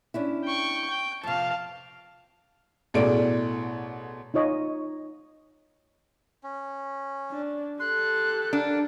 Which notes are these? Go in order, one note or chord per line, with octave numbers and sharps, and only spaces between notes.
C#4 D4 E4
G5 C#6
G5
F2 C3 F5 A5
A1 B2 A3 G#4 D5 D7
D#4 F4 C#5 D#5
C#4
D4
G4 A4 C6 F#6
D4 A#4 D5 F#5